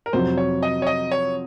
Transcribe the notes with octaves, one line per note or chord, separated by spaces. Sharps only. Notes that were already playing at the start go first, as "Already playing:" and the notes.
A#4
F2 C3 F#3 C4 C5
C#5
D#5
C#5
D#5
C#5